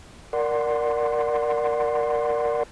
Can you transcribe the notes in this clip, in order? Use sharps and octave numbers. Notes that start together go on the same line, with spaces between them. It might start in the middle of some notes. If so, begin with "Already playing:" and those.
A#4 D5 F#5 C6